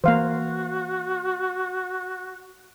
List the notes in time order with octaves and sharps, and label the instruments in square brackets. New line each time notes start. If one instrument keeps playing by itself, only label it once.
[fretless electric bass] E3 A#3 [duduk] F#4 [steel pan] C5 F5